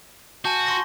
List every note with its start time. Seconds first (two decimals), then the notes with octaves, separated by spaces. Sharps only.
0.45 F#4 G#5 A5 G6
0.66 C6 C#6 A#6